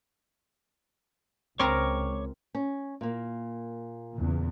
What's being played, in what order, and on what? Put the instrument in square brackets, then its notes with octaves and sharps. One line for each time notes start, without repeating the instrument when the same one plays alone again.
[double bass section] C#2 [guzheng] C4 A#4 A#5 [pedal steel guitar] C#5 C#6 D6
[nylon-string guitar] C#4
A#2 A#3
[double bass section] E2 A#2 C#3